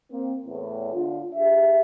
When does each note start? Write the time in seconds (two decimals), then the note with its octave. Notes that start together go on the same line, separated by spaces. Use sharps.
0.12 A#3 C4
0.46 E2 A2
0.93 D3 F4
1.34 D4 G4 G#4 E5